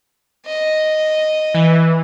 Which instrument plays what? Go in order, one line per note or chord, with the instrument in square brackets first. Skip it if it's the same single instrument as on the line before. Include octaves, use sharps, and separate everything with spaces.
[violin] D#5
[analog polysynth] E3